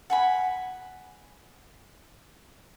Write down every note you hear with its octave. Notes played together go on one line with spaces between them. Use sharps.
F#5 G#5 B5